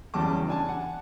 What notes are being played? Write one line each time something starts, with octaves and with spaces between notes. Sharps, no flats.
E2 C#3 F#3 G3 A5 D6
D4 G#5 A5
F#5